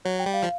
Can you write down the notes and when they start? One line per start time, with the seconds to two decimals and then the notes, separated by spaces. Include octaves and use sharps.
0.05 F#3 C#5
0.19 G5
0.26 G3
0.33 F5
0.43 F3